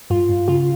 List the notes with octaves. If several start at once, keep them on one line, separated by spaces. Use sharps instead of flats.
G2 F4
G2
C#3 F4